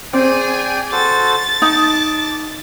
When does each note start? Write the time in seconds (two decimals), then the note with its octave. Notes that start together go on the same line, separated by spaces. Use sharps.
0.13 C4 G#4 D5 G5 G#5
0.92 F#4 A4 C5 A6
1.62 D#4 A5 D6